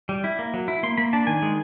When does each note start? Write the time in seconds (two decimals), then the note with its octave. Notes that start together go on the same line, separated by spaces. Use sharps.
0.09 G3
0.24 E4
0.39 A#3
0.54 F#3
0.68 E4
0.83 A#3 C6
0.97 A#3 B5
1.13 D4 A5
1.27 D#3 G#5
1.42 G#3